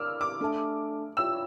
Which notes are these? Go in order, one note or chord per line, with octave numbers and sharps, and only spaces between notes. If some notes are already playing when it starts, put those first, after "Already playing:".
Already playing: A#4 D5 F5 D6 E6 F6
D6
A3 D4 A4 E5 A5
F4 C#5 E5 G5 E6